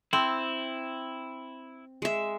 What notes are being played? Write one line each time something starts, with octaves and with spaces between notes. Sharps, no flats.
C4 E4
G#3 E5